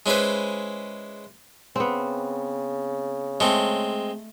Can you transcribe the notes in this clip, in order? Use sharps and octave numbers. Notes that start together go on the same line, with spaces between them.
G#3 C#4 E4 B4 C5
C#3 B3 C4
G#3 A3 C4